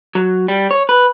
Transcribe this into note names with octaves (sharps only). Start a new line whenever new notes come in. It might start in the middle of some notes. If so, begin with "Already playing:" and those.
F#3
G3
C#5
B4